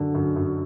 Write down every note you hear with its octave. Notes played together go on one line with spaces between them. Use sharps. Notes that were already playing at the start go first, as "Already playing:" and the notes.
Already playing: F#2 D3
F#2
F#2